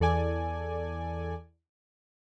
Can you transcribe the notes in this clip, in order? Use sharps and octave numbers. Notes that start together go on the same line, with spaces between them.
E2 A4 D5 G#5